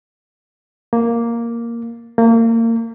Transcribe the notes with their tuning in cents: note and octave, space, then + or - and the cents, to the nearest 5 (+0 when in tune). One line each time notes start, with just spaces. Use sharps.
A#3 +0
A#3 -30